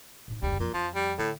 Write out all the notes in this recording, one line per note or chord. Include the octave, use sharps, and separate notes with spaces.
A2 D#4
F#1 D2 G3
F2 A#2
F2 F3
G3
A2 D3